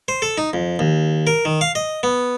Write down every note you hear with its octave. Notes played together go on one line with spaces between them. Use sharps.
C5
A4
D#4
F2
D#2
A#4
D#3
F5
D#5
B3